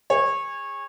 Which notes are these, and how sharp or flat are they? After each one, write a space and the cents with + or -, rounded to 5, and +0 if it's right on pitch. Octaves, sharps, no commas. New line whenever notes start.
G#4 -25 C#5 -20